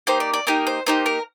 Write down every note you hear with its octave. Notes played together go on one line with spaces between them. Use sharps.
A#3 D#4 G4 C5
D5
D5
A#3 D#4 G4 A#4
C5
A#3 D#4 G4 C5
A#4